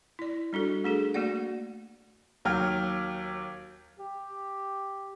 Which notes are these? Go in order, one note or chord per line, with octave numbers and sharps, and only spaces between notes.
E4 D5
G3 D4 F#4 A4
A3 D4 G#4 A4
A3 A#3 F#4 D5 F#5
D#2 F#3 G5 F6
G4